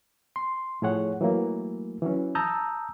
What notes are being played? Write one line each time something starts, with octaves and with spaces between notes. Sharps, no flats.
C6
A2 F3 G#4 C#5 F#5
E3 F#3 A3 A#3
E3 F#3 C#4
A5 A#5 D#6 E6 G6